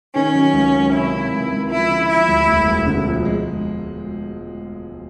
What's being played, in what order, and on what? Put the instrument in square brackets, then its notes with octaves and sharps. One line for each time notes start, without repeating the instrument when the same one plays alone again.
[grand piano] D#3 [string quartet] C#4
[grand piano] F#3
C#2
F#3
[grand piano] C3 [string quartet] E4
[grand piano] C3
C#2
C#2
[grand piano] F3 [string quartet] E4
[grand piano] D3
[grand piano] F3 [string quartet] E4
[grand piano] D2
E1
E1
D3
F3
G#3